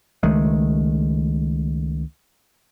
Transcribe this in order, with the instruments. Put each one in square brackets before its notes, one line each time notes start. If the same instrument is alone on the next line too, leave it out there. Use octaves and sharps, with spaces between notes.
[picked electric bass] C#2 D#3 G#3 A3